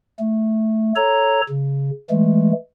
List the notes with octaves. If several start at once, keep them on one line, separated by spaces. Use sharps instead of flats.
A3
A4 C#5 A#5
C#3
E3 G#3 A3